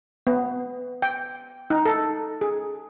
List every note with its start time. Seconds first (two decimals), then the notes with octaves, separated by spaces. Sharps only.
0.27 B3
1.02 G5
1.70 D#4
1.85 A4
2.41 G#4